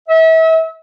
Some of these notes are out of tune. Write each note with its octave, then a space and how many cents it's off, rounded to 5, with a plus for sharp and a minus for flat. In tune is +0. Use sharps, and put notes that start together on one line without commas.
E5 -35